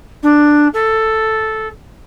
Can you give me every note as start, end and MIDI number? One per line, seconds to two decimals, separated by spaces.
0.23 0.68 62
0.74 1.68 69